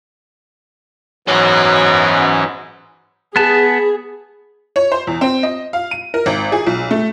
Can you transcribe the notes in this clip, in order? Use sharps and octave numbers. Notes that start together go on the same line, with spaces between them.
G#2 B2 E3 C#4 F#4
B3 G#4 A5
C#5
C5
E2
C4
D#5
F5
D#7
A#4
G#1
G#4
B1
A3